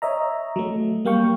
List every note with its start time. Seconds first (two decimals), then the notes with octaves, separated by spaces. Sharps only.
0.02 C#5 D#5 E5 A#5
0.56 F#3 A3
1.05 G3 A#3 F5 G5 C#6